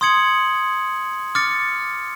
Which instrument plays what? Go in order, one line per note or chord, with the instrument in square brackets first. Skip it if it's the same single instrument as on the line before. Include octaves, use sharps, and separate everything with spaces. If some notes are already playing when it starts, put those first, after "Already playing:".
[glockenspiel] C6 D#6 G#6 C#7 F#7
D6 F6 A6 C#7